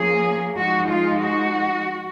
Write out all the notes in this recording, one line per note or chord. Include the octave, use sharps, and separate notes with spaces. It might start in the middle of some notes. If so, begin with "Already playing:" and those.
Already playing: F3 A#3 C#4 G#4
F3 G#3 D#4 F#4
F4
F#4